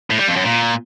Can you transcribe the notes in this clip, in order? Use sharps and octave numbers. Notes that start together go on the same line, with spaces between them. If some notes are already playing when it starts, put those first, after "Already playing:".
A2
G3
F2
F#2
A#2